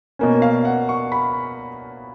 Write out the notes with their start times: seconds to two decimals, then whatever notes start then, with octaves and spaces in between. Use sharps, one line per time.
0.19 B2 A#3 C#4
0.42 F5
0.65 F#5
0.89 C#6
1.12 B5